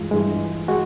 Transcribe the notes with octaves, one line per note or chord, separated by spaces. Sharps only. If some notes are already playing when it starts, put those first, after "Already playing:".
Already playing: G2 E3 G#3 F4
G2 E3 G#3
G#3 F#4